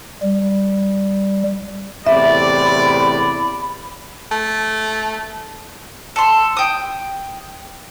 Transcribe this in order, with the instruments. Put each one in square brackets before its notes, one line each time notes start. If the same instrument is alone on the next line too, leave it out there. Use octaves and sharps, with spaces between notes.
[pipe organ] G3
[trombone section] E2 A2 C3 [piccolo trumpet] D5 [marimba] E5 [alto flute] B5
[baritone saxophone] A3
[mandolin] A4 C6
G5 D#6